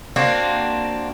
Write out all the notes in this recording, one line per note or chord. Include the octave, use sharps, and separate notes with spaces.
A#3 C4 D4 F#4